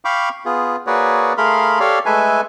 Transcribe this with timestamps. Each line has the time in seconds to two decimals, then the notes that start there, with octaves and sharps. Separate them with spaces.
0.05 F5 G5 B5 C#6 D6
0.45 B3 F4 G#4
0.87 A#3 F#4 G#4 B4 C#5 D5
1.37 A3 G#4 A#4 F5 B5 C6
1.80 G4 A4 C#5 D5 F5
2.06 G#3 A3 A4 B4 E5 G#5